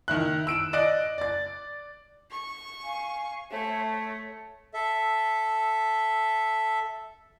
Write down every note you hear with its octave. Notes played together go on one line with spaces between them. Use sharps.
D#3 E4 F#6
E6 D7 E7
D5 D#5 F#6 D7
D5 A6
C#6
F5 G#5
A3 C5 C#5 E5
C#5
A4 E5